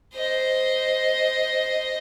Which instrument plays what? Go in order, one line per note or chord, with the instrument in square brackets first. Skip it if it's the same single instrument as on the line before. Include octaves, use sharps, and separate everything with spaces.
[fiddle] C5 D#5